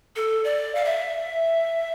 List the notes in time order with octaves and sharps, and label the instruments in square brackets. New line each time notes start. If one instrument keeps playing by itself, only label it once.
[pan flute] A4
D5
F5
E5